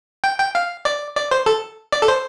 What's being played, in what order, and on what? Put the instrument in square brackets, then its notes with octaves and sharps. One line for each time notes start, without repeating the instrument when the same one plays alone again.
[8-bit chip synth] G5
G5
F5
D5
D5
C5
A4
D5
A4
C5